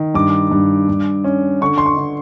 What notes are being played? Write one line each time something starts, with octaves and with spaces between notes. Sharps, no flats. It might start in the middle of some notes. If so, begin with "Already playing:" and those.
Already playing: D#3
G2 D6
G2
G2
C#4
D3 C#6
C6
C#6
D3